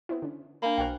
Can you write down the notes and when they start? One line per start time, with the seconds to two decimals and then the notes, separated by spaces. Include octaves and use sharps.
0.09 B3 C4 E4
0.22 D3 C#4
0.62 A#3 D4 B5
0.78 B1 F#4 C5 F5 G5